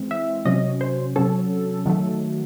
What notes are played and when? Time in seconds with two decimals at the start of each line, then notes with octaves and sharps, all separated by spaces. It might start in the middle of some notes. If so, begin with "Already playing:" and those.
Already playing: E3 G#3 C4
0.11 E5
0.45 C3 F#3 C#4 D#5
0.81 C5
1.16 C3 F#3 C#4 A4
1.86 D#3 F#3 A3